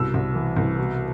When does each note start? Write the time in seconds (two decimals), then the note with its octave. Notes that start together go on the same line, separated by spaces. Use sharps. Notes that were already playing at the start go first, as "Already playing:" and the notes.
Already playing: C2 B2 E6
0.14 C2
0.35 E3
0.57 C2
0.78 B2